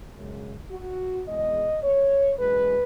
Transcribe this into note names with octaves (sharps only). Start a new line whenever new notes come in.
F#2 C#3 G#3
F#4
E2 B2 G#3 D#5
C#5
F#2 E3 G#3 B4